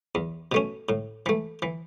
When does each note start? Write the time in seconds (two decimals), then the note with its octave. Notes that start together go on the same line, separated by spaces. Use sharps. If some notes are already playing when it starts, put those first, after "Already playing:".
0.15 E2
0.52 B2 A3 C#4
0.89 A2
1.26 E3 A3
1.62 E3